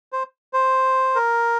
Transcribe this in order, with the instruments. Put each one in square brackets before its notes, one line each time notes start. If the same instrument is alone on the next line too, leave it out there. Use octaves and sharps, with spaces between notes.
[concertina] C5
C5
A#4